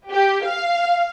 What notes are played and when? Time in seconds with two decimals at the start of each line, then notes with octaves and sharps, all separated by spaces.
0.10 G4
0.45 F5